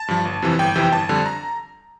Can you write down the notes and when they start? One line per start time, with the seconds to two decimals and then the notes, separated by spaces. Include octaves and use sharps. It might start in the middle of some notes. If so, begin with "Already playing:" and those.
Already playing: A5
0.08 G2 F3
0.25 G1
0.42 F2 C3 E3
0.59 G1 G5
0.76 F2 C3 E3
0.92 G1 A5
1.09 F2 D3 G3
1.26 A#5